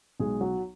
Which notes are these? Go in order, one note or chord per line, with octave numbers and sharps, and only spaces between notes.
B1 G#3 G#4
F#3 F#4